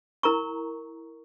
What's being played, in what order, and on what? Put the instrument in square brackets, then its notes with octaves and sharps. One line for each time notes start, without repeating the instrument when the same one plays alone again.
[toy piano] E4 A#4 A#5 C#6